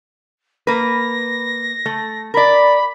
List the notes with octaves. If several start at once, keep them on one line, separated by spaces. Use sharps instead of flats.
A#3 B4 A#6
A3
A#4 D5 B5